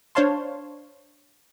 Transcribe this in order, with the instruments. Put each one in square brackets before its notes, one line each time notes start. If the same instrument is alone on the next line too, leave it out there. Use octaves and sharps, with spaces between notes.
[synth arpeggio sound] D4 C5 C#5 F5 A5 C6